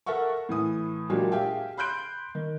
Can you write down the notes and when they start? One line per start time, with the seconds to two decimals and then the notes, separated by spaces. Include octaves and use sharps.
0.06 A4 A#4 E5 F#5 C#6
0.49 A2 E3 D#6
1.10 A#2 F#3 G#3 D4 F#4 G4
1.32 G4 G#4 E5 F5 G5
1.77 B5 C6 F#6 G6 D7
2.35 D#3